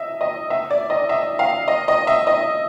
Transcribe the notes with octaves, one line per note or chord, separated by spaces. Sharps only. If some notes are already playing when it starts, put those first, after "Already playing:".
Already playing: D#5 E5
D#5
E5
D5
D#5
E5
F5
D#5
D#5
E5
D#5